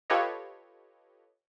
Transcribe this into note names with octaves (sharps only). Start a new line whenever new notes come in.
F4 G4 A4 B4 C#5 D#5